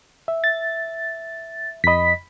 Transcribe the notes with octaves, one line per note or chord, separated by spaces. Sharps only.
E5
A6
F2 D#5 B5 B6